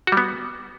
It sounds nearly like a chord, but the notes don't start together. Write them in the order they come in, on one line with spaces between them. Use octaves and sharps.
F#4 G3 B3